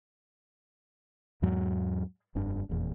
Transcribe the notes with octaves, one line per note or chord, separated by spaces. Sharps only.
E2 G#2 F#3 G#3
F1 G2 D4
F1 E2 A#2